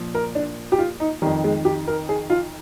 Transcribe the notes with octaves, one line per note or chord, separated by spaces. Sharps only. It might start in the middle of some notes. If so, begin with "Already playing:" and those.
Already playing: A#2 F3
A#4
D4
G4
F4
D#4
F2 D#3 G3
G#3
G4
A#4
G#4
F4